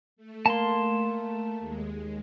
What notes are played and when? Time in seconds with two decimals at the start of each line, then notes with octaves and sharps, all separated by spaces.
0.16 A3
0.46 A#3 A5 C6
1.59 D#2 G#3